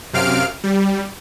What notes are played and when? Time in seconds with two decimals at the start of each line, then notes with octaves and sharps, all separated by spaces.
0.13 F#2 C3 F5 F6 D7
0.64 G3